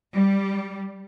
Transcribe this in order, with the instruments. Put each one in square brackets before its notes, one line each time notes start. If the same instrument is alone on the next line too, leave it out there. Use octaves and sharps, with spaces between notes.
[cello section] G3